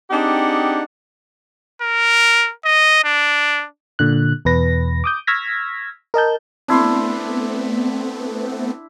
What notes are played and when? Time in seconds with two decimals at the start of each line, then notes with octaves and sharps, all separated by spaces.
0.10 C4 D4 D#4 G4 G#4 F#5
1.82 A#4
2.65 D#5
3.04 D4
3.99 A#2 D3 F#6
4.45 E2 B2 B4 A#6
5.04 D6 D#6 G6
5.27 C#6 E6 F6 G#6 A#6 B6
6.14 A#4 D#5 A5 G6
6.68 A3 B3 C4 D4 E4 C6